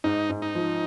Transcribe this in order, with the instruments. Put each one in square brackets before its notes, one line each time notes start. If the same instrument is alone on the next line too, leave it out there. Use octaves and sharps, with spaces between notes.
[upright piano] G#2 [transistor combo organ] D#4
[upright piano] G#2
[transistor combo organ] D#4
[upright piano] F3